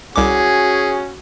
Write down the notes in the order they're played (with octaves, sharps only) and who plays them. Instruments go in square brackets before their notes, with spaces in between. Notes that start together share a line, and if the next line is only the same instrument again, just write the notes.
[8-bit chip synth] C2 D6 [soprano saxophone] C#4 [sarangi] F#4 [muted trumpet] G#4